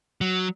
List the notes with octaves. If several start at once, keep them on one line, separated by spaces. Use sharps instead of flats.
F#3